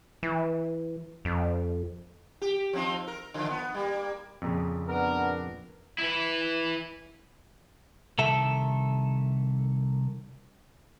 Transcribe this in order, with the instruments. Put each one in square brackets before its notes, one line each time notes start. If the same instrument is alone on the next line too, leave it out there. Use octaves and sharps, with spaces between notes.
[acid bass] E3
F2
[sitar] G4
F3 C4 D#4
A#4
D3 F3
B3
G3 A#3
[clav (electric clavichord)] F2 A#2 C#3
[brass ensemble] B3 D4 A#4
[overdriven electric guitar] E4 B4
[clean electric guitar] C2 D#3 A4 E5